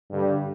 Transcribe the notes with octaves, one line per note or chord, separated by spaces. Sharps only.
G2 D3 G3